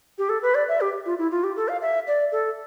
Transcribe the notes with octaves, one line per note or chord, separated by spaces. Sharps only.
G4
A4
B4
D5
E5
G4
F4
E4
F4
G4
A4
F5
E5
D5
A4